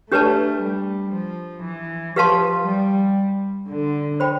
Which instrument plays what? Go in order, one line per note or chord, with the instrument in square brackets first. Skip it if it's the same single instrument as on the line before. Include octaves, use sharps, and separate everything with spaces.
[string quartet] A3 [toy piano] D4 G4 B4 D5 A5
[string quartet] G3
F3
E3
[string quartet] F3 [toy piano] G4 B4 F5 A5 C6
[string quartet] G3
D3
[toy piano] C5 G5 B5